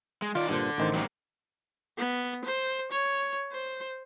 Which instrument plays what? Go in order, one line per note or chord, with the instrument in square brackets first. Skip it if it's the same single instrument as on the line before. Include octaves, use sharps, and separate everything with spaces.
[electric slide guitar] G#3
[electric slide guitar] D#3 D5 [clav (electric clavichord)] F4
[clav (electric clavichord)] G2 A#2 C5 [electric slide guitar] D3
[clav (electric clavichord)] A1 D#3 C5
[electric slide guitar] F#3 G3 A#3
[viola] B3
C5
C#5
C5